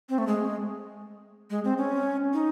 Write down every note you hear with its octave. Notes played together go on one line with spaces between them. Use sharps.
C4
A3
G#3
G#3
C4
C#4
D#4